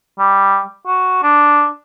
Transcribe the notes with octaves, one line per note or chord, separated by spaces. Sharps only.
G3
F#4
D4